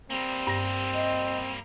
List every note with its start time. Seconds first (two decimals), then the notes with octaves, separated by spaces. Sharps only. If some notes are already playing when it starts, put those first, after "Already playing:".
0.10 G3 A#3 C4
0.47 G2 A#6
0.94 D#5